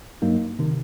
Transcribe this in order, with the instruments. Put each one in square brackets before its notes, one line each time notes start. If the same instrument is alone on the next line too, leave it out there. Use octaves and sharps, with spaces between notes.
[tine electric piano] G2 F#3 A#3 D#4
C3 D#3